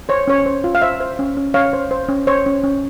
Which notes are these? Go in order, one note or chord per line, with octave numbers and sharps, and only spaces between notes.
C5 C#5
C#4 C#5
C5
F4
F5
C5 E5
C5
C#4
C#4
C#4 C#5 F5
C5
C5
C#4
C5 C#5
C#4
C#4